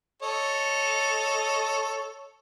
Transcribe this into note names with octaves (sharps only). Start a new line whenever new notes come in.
A4 C#5 D#5